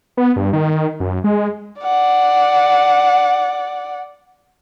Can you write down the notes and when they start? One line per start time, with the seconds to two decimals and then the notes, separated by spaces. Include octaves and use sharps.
0.17 B3
0.36 G2
0.53 D#3
1.00 F#2
1.24 G#3
1.82 D5 F#5